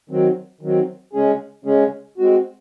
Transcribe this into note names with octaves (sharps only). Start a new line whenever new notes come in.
D#3 F#3 C4
D#3 F#3 C4
C#3 G#3 C#4 G#4
C#3 G#3 C#4 G#4
G#3 C4 F#4